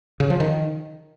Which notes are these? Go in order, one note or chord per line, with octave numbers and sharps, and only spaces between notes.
C#3
F3
D#3